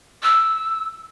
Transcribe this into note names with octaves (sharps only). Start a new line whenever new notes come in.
E6